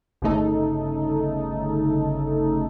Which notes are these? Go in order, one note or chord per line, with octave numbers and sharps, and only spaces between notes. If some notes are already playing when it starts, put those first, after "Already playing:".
G1 D2 C#3 A3 D#4 A4